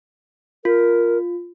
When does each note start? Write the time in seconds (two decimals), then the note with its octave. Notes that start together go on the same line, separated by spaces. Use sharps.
0.65 F4 A#4